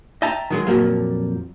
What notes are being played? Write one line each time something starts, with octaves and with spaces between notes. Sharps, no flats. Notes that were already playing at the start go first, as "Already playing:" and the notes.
D#5 E5 G5 A5 A#5
D#3 F#3 G#3
F2 A#2 F3 F#3 A#3